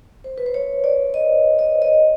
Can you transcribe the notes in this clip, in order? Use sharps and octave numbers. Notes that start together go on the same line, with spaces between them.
C5
B4
C5
C#5
D5
D#5
D#5
D#5